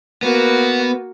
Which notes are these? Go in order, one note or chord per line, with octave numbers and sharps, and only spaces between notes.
A#3 B3 F#4